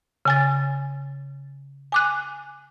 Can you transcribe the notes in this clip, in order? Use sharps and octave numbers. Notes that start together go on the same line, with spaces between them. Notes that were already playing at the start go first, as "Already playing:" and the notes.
C#3 G#5 A6
G#5 D6 F#6